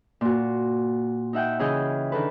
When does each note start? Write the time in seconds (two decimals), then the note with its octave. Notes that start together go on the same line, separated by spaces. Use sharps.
0.21 A#2 F#4
1.33 D#4 E5 F#5 G5
1.59 C#3 E3 G#4 D#5 G5 F6
2.12 D#3 D4 A4 B4